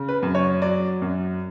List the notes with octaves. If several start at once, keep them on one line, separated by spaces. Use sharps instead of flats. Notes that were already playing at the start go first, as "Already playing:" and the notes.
Already playing: C#3
B4
F#2
C#5
F#3 D5
F#2